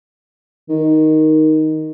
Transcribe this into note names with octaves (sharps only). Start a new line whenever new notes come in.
D#3